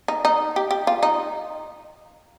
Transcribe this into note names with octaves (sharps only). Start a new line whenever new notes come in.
D#4
D#4
G4
G4
F4
D#4